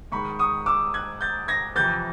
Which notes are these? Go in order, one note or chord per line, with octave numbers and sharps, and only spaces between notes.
G#2 D#3 G#3 B5 C#6
C#6 D#6
D6 E6
F#6 G#6
G6 A6
G#6 A#6
F2 C3 E3 G6 A6